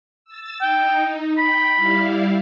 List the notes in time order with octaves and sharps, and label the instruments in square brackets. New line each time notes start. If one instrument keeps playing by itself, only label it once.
[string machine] E6 A6
[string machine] D#4 [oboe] G5
[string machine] G5 [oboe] B5
[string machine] G3 E4 F5